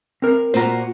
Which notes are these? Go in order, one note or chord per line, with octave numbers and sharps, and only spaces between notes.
C4 A#4
A#2 A#3 F#4 C5 A#5